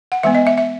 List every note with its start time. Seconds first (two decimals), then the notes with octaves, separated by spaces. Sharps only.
0.12 F#5
0.23 E3 G#3 B3 E5
0.35 D#5
0.47 E5
0.58 E5